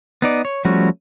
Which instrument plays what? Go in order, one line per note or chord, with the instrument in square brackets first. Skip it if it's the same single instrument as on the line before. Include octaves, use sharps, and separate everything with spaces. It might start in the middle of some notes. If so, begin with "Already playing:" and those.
[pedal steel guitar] B3 D#4 D5
C#5
F3 G3 A3 C#4 F#4